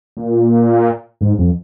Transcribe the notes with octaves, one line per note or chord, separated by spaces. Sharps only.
A#2
G#2
F2